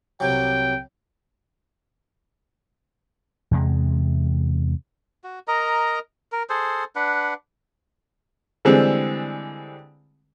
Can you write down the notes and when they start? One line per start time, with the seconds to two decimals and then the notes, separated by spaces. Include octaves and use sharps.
0.20 C2 C3 F#3 G5
3.51 E2 C3 G#3
5.24 F#4
5.48 A#4 D#5 A#5
6.32 A#4
6.50 G#4 A4 C5
6.96 D4 B4 F#5
8.65 D3 E3 G3 G#3 C4